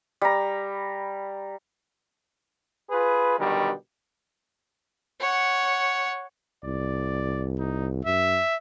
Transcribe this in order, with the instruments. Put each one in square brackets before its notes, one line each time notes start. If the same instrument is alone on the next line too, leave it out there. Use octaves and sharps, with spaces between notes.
[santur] G3 A#5
[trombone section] F4 G#4 B4
B2 D3 D#3 F#3 G3
[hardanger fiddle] C#5 F#5
[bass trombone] C2 [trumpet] D5
[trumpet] D#4
[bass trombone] F#2 [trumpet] E5